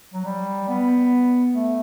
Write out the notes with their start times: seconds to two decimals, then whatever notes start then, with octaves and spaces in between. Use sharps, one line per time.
0.14 F#3
0.25 G3
0.68 B3
1.55 A3